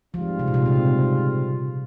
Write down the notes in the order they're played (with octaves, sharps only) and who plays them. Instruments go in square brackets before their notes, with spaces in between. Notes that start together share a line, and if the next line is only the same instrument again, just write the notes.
[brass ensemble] G#2 G3 C4 F4 [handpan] F3
[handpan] C3
A#2
C3
C#3